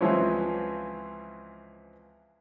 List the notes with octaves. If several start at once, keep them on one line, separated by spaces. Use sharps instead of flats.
C#2 E3 F3 C4 C#4